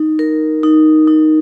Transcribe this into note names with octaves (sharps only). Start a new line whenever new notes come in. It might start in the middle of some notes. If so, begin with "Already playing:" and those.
Already playing: D#4
A#4
D#4
D#4